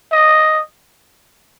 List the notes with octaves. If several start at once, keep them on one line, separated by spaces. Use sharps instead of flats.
D#5